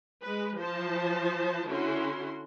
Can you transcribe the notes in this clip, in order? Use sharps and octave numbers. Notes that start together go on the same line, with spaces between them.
G#3 B4
F3 C5 A5
D3 C#4 E4 F#4 C6